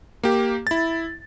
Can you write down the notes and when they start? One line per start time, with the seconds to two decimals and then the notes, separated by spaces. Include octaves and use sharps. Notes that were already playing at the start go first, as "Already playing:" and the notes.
0.23 A#3 G4
0.67 E4 A6